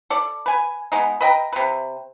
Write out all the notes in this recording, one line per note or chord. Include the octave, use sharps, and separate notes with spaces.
A4 D5
B4 G#5
G#3 B3 D#4
B4 D#5 G5 A#5
C3 B4